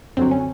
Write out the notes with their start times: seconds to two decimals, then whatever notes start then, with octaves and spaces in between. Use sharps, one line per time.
0.17 F#2 D3 F#3 C4
0.31 C#4